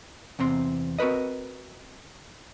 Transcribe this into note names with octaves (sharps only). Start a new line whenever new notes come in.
E2 C3 C4 C6
C4 F#4 A#4 B4 D#5